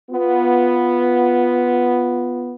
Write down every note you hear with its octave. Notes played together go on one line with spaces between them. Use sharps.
B3 F4